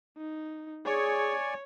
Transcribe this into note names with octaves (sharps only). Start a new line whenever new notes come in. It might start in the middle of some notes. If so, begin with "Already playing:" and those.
D#4
G#4 C#5 D5 G#5 C#6